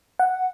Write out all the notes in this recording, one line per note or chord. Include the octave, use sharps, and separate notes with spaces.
F#5